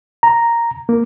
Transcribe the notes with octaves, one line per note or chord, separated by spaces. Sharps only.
A#5
A#3